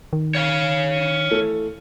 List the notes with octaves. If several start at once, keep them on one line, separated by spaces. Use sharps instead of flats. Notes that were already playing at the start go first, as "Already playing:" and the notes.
D#3
C#5 F5
E3 A3